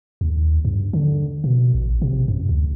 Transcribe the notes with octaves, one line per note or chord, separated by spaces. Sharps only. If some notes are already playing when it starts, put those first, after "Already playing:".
D#2
G2
D3
B2
A1
C3
F#2
D2